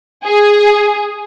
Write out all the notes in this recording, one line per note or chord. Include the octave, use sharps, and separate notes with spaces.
G#4